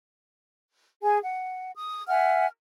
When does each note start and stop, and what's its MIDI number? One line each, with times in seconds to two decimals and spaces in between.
1.02 1.18 68
1.02 1.18 80
1.23 1.71 78
1.75 2.04 87
2.08 2.46 76
2.08 2.46 78
2.08 2.46 80
2.08 2.46 89